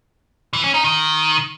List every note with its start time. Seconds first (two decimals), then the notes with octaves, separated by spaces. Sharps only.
0.53 E3
0.64 C#4
0.74 D#4
0.84 D#3